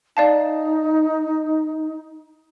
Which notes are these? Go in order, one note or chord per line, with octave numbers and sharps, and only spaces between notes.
D#4 D5 F5 A5